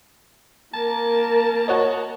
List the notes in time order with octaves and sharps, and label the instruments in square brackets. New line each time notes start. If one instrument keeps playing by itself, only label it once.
[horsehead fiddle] A#3 A#4 [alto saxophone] A5
[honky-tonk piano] F#4 C#5 D#5